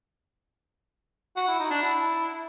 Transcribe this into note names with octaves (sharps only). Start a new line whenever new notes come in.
F#4
E4
D#4
D4
E4